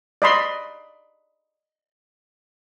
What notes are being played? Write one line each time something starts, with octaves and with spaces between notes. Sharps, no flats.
D5 D#5 B5 C6